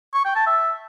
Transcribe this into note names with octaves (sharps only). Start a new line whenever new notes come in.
C#6
G5
A5
E5